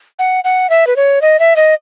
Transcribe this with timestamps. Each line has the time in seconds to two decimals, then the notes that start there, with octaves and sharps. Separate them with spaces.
0.19 F#5
0.44 F#5
0.70 E5
0.87 B4
0.96 C#5
1.22 D#5
1.39 E5
1.56 D#5